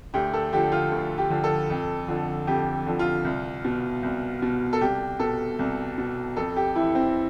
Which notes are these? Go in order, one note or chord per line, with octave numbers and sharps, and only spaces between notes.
D2 G4
A4
D3 F3 G4
F4
D2
G4
D3 F3
A4
F2
D3 F3
F2 G4
D3 F3
F4
C2
B2
C2
B2
A4
C2 G4
B2 A4
C2
B2
F2 A4
G4
E3 E4
C4